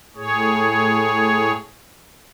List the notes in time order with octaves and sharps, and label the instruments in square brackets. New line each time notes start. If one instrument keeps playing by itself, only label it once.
[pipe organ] A2 G#4 C#5